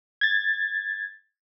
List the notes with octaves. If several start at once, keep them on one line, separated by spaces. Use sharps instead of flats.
G#6 A6